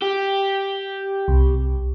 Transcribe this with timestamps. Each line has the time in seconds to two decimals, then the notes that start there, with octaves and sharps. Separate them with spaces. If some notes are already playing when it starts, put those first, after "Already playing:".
0.02 G4
1.28 C2